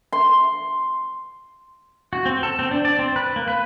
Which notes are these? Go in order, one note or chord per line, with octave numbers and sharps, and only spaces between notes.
C6
F#4
C4
A4
C4
D4
D5
C4
B4
A#3
B4